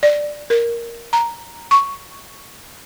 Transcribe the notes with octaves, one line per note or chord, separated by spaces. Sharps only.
D5
A#4
A#5
C#6